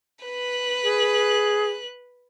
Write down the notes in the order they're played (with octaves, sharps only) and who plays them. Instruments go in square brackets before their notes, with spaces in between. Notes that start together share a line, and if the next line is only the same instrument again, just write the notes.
[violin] B4 F#6
[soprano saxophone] G#4